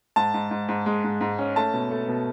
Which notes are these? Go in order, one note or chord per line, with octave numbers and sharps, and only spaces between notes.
G#2 A5
G#2
G#2
G#2
G#3
G#2
G#2
C#4
A3 A5
B2
A3
B2